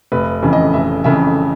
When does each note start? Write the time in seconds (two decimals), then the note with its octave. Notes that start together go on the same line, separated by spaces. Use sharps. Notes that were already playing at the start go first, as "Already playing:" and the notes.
0.12 F1 B4
0.42 F2 C#3 E3
0.53 D#5
0.73 F1 E5
1.04 F2 C#3 E3 E5